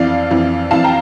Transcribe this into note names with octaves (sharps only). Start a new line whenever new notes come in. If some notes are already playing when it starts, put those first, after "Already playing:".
Already playing: F2 E3 D5 F5
F2 E3
F2 E3 F5 A5
G5 A#5